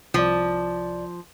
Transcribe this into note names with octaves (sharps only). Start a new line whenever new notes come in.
C2 F3 D5